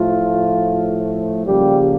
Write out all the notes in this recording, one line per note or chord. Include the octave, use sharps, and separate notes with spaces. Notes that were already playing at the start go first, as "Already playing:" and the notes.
Already playing: A2 F3 A3 F4
C#3 F3 G3 A#3 G4